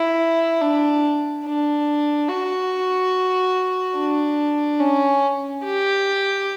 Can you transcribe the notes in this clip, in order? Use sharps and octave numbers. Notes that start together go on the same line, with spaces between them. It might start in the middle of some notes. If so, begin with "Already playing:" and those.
Already playing: E4
D4
D4
F#4
D4
C#4
G4